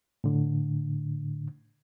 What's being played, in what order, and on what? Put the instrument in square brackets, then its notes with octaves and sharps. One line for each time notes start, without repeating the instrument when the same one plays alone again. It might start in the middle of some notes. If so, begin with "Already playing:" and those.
[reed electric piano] A2 D3